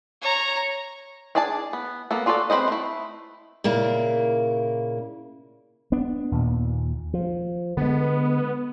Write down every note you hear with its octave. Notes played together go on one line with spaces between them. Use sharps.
C#5 A#5
D4 G#4 D5 G#5 A5
B3
A#3 B3 A4
D4 F4 F#4 A4 D5
C4 D4 B4 C5 D#5
A3 E4
A#2 C#3 A#3 E4
B3 D4
D#2 A#2
F3
D3 G#3 B3